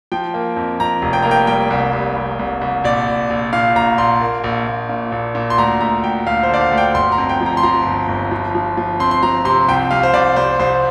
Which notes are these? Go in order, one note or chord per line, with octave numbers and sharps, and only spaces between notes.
F3 G5
A#3
F2
F2 A#5
F1
G5
A#3 A#5
G5
G3 G5
C2
C2
C2
C2
C2
A#1 D5
A#1
A#1
A#2 F5
A#1 A#5
A#1 C6
A#3
A#1
A#1
A#2
A#1
A#2
C6
D2 A#5
D2 A#5
D2 G5
D2 F5
C5
D3 D5
F5
D2
G5
G1 C6
A#5
F2
G5
F3
A#5
C6
F3 A#5
G1
G1
F3
F3
F3
C4 C6
C6
F3 A#5
C3 C6
C2 G5
C2 F5
C5
C2 D5
C2 C5
C2 C5